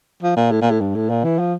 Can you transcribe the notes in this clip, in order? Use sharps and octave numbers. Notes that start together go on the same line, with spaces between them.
F3
A#2
A2
A#2
A2
G2
A2
A#2
E3
F3